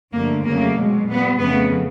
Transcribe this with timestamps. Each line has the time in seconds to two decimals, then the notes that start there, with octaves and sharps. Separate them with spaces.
0.12 G2 D3 F3 A3 A#3
0.44 F2 C#3 F#3 A3 A#3
0.75 B2 G#3
1.07 A#2 G3 B3
1.39 F2 C#3 F3 A3 B3